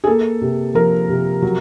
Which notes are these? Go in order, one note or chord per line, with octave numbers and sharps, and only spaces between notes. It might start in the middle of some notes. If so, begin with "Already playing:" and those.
G#4
A#3 A4
C3
F3 A#4
C3
F#3